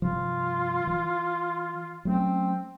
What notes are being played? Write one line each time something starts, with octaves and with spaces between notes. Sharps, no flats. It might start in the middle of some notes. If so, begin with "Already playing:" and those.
G2 C3 F3 F4
E3
F#3 A3 C4 C#4